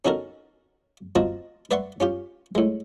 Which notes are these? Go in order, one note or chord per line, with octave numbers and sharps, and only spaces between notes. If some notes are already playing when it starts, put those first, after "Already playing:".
C#4 D#4 F#4 A4 A#4
C4 F4 F#4 D#5 A5 A#5
B4 D5 E5 F#5 C6 C#6
C#4 F4 G4
A2 G#3